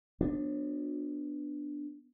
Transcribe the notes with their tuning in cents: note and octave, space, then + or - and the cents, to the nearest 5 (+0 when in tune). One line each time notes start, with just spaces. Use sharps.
F#3 -40 B3 +0 D4 +0